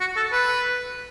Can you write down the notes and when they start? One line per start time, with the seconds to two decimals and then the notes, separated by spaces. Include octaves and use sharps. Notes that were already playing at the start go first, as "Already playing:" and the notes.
0.01 F#4
0.17 A4
0.32 B4